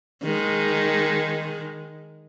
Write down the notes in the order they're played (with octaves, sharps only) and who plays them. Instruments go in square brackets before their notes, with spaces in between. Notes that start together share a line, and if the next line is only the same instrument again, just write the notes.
[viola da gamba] D#3 G#3